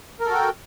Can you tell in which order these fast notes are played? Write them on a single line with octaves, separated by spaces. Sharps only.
A#4 A4 F#4 G5